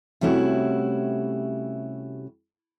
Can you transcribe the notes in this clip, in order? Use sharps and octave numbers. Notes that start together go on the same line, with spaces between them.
C3 G3 A3 C#4 E4 F#4